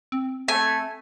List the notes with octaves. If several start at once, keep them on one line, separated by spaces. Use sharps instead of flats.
C4
A3 G#5